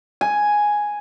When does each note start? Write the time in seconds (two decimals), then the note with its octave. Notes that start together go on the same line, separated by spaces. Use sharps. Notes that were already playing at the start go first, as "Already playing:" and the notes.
0.21 G#5